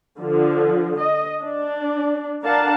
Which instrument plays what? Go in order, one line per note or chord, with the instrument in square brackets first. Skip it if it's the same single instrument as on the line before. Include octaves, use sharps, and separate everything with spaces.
[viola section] D3 F3
D#5
D4
D4 A#4 F5 F#5 A5